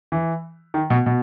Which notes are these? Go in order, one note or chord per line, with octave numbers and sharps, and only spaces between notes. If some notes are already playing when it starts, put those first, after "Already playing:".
E3
D#3
B2
B2